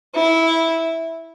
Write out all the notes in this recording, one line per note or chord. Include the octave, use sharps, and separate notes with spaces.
E4